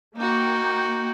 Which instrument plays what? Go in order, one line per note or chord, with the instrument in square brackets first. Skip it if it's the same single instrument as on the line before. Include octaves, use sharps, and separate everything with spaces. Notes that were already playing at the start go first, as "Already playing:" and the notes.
[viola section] A#3 G5 [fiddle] D#4 F#4